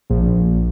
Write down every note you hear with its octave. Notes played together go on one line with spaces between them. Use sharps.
A#1